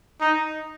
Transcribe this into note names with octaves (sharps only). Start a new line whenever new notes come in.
D#4